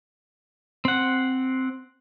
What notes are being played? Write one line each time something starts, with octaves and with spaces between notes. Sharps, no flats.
C4 F#5